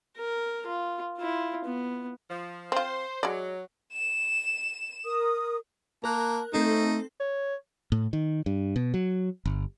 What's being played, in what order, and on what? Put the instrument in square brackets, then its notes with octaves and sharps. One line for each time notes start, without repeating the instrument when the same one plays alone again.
[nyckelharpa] A#4
F4
E4 F4
B3
[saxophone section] F3
[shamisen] C4 F4 [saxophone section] C5
[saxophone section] F#3 [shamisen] G#3 D5
[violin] E7
[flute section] A#4 D#6
[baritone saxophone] A#3 [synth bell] A#4 F#6 [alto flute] A5
[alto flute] A3 [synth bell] C4 A4 [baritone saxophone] D#4
[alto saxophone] C#5
[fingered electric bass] A2
D#3
G2
B2
F#3
G1